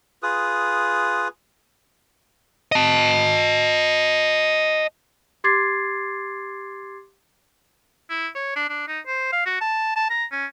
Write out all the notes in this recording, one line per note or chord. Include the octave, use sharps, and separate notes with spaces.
F4 G#4 B4 D#6
D#5 A5
G4 C6 D6 G#6 A6 C7
E4
C#5
D4
D4
D#4
C5
F5
F#4
A5
A5
A#5
C#4